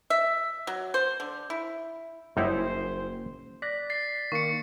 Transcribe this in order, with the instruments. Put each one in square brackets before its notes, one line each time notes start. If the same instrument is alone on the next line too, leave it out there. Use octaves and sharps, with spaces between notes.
[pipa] E5
F#3
C5
D3
E4
[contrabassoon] F#1 [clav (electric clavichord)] F#2 [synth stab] G3 D#4 E4 [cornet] C5
[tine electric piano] D5 F#6 A#6 [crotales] B6
[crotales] A6 C7
[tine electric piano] D#3 A#3 [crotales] C#6 C#7